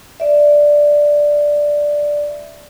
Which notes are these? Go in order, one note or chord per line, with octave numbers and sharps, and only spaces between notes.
D5 E5